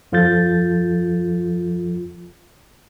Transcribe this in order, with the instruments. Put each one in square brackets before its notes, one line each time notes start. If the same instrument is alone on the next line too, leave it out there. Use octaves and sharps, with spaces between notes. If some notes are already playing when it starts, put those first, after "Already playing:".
[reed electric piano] F2 F3 F4 A4 G6 A6